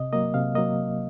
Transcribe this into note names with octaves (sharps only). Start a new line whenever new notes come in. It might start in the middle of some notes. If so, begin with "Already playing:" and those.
Already playing: C3 D#5
F#3 A#3 D#5
C3 F5
F#3 A#3 D#5